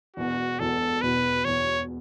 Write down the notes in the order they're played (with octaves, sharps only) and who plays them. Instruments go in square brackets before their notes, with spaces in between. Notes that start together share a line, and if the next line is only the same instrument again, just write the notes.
[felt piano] E1 E2 B2 [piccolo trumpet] F#4
[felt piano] E1 E2 B2 [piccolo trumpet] A4
[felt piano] E1 E2 B2 [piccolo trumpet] B4
[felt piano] E1 E2 B2 [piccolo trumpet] C#5